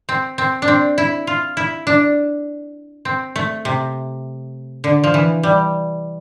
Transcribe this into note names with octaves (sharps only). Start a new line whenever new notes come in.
C4
C4
D4
C4
E4
F4
E4
D4
C4
A3
C3
D3
F3
E3
G3